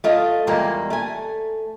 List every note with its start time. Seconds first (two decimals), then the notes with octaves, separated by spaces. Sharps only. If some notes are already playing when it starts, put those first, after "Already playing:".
0.04 A3 F4 D#5
0.47 E2 A#2 G3 G#3 A#3
0.90 A3 G#5